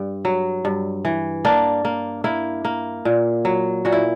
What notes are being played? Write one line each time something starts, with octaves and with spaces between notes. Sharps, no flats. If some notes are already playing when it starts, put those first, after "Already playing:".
Already playing: G2
F#3
G2
E3
A#3 D4
A#3
A#3 E4
A#3
A#2
F#3
A#2 F#4
E4